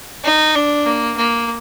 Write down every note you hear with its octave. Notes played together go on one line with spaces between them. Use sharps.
D#4
D4
A#3
A#3